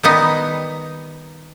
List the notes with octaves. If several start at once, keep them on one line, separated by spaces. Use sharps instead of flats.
D#3 G3 B3 D#4